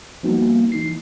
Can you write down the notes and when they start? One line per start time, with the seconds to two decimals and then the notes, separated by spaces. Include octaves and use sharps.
0.23 F3 G3 A#3 B3 D#4 F#4
0.72 E3 D#4 C7